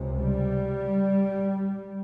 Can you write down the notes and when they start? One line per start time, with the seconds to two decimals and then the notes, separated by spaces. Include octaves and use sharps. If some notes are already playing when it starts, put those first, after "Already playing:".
Already playing: C#2 C3
0.20 G3